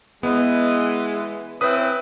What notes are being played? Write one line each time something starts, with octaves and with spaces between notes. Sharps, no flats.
E3 G#3 B3
C4 C#4 E4 B4 D#6